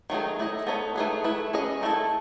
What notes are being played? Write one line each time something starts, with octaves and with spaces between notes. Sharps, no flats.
D#3 F#3 A3 D#4 G#4
A3 E4 G#4 D#5
B3 D#4 A4 C#5
A3 D#4 G#4 B4
A3 E4 B4
C#4 G#4 D#5
D#3 A3 C#4 E4 A4